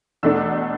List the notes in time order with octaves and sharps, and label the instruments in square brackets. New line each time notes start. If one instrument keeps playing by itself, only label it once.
[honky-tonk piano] E2 B2 A3 D4 E6